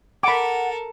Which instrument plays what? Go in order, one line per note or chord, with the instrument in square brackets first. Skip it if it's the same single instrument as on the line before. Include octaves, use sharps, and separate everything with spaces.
[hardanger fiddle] A4 A#4 [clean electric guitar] F#5 [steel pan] B5 D6